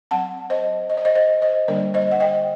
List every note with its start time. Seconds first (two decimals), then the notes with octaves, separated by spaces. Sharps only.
0.11 F#3 C4 F#5 A5
0.50 C5 D#5
0.90 D#5
0.97 D5
1.05 C5 D#5
1.15 C5 D#5
1.42 C5 D#5
1.68 D3 G3 A#3 D4 A#4 D5
1.94 C5 D#5
2.11 F#5
2.20 D#5 G5